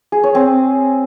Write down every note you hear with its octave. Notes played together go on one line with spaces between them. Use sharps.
G#4
C#5
C4